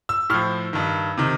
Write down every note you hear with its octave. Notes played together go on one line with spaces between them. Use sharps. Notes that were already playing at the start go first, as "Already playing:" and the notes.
E6
A2 F3 F6
G2 D#3
C3 D#3